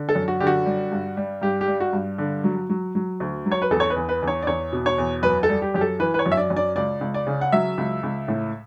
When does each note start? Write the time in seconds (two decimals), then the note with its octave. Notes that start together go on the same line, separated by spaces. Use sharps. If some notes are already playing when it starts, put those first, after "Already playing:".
Already playing: D3
0.09 A4
0.15 F#2
0.28 F#4
0.40 D3 G4
0.47 F#4
0.66 G3
0.92 G2
1.17 G3
1.42 G2 G4
1.61 G4
1.68 G3
1.80 F#4
1.93 G2
2.18 D3
2.44 F#3
2.69 F#3
2.95 F#3
3.20 D2
3.46 F#3
3.52 C#5
3.62 B4
3.71 E2 A4
3.80 C#5
3.90 B4
3.96 E2
4.09 B4
4.22 E2
4.27 C#5
4.42 D5
4.47 E2 C#5
4.73 B2
4.86 C#5
4.98 E2
5.23 F#2 B4
5.43 A4
5.49 G3
5.62 G4
5.74 F#2 G4
5.81 A4
5.99 E3 B4
6.14 B4
6.19 C#5
6.26 F#2
6.32 E5
6.37 D5
6.50 F#2
6.56 D5
6.76 C#2 D5
7.01 C#2
7.14 D5
7.27 C#3
7.41 F#5
7.52 F#3 E5
7.78 C#2
8.03 C#2
8.28 A2